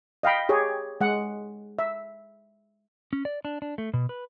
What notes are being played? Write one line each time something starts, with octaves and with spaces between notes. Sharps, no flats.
D#5 F5 G5 B5
G4 G#4 C#5
G#3 F#5
E5
C#4
D5
D4
D4
A3
B2
B4